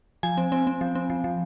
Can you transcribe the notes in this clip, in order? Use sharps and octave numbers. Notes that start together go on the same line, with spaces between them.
F3 G#5
C4
C4
C4
F3
C4
F3
F3